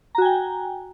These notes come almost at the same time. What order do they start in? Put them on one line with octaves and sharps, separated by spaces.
A#5 F#4 G#5 G5